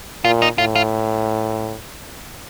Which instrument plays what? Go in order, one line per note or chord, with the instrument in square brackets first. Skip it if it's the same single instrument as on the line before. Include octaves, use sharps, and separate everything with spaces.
[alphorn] A#2 [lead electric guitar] F4
[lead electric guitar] D#4
[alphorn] A2 [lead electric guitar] F4
[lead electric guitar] F4